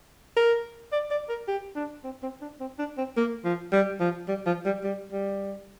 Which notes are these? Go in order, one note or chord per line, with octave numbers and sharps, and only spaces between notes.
A#4
D5
D5
A#4
G4
D4
C4
C4
D4
C4
D4
C4
A#3
F3
G3
F3
G3
F3
G3
G3
G3